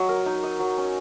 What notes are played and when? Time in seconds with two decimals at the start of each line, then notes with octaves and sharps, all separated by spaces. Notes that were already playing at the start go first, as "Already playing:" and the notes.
Already playing: F#3 D#5
0.09 A#4
0.26 D#4
0.43 D#5
0.60 F#3
0.78 C#4